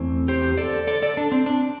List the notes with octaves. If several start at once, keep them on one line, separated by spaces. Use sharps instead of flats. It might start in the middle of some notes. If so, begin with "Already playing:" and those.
Already playing: E2 E3 A3 C4
G4 C5
A4 D5
A4 D5
A4 D5
D4
C4
D4